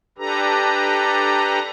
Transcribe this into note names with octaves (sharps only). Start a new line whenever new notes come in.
D4 G4 A4 B4 A#5